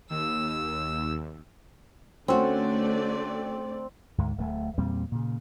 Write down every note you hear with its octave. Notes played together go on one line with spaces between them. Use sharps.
D#2 E6
D3 A3 C4 C#4 F#4 D5
D2 G#2
D1 A3
E2 A#2 G3 C4
A#2 C#3